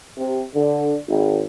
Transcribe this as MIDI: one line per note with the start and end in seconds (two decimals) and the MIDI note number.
0.17 0.42 48
0.55 0.96 50
1.08 1.42 32